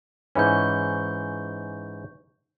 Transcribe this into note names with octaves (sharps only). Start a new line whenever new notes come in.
G#2 E3 C#4 C#6 G6